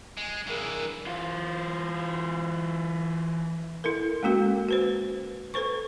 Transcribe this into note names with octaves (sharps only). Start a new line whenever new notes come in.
G#3
G2 E3 G#4 A#4
E3 F4
E4 A4 A#4
G#3 A#3 C#4 F#4 A#4
F#4 B4 C5
A4 B4 C5 C#6